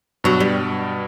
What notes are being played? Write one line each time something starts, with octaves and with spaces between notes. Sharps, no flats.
G2 B2 F#3
G3